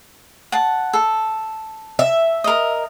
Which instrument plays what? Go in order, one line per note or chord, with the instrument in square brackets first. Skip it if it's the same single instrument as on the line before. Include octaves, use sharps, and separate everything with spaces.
[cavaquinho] F#5 A5
A4
[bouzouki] E5
[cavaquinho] A#4 D#5